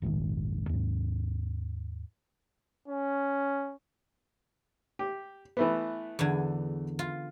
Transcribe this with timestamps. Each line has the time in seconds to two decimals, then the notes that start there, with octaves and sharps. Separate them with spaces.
0.02 F1 A#1 G#2 D#3
0.69 D#2 G#2
2.88 C#4
4.99 G4
5.57 E3 A3 B3
6.19 E2 D3
6.99 F4